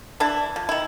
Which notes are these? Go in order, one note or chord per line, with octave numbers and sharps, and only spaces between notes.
E3 D4 E4 A5
F3
D#3 E4